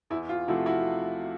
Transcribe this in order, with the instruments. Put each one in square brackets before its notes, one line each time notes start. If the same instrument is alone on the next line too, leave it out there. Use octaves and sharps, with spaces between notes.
[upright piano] E2 E4
F4
C3 F3 A3 E4 F#4
E4 F#4